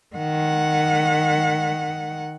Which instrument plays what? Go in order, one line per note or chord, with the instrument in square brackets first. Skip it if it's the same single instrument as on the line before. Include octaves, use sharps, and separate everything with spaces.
[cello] D#3 F#5